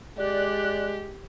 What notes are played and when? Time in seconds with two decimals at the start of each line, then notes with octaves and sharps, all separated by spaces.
0.18 G#3 G4 D5 F#6